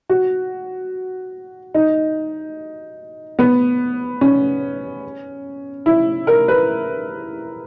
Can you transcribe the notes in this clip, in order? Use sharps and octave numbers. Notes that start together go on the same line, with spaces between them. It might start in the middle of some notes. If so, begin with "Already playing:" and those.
F#4
D#4
B3
C#4
E4
A#4
B4